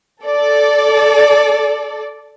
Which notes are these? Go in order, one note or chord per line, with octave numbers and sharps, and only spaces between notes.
A4 D5